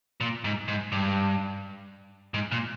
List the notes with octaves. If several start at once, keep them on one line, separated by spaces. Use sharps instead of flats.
A#2
G#2
G#2
G2
G#2
A#2